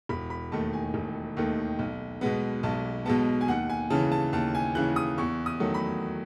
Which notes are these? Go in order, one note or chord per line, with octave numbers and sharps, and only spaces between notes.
E1 B5
B5
D#2 D#3 A3 A5
G#5
E1
D#2 D#3 A3
B1
B2 G#3 B3
B1 A5
B2 G#3 B3 A5
G#5
D#2 F#5
G#5
C#3 E3 A5
A5
D#2 A5
G#5
C#3 E3 F#6
D#6
E2 C#6
D#6
D#3 F#3 A3
B5